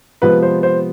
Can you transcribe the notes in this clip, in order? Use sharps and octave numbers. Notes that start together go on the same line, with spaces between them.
C3 F3 G#3 B3 B4
C5
C5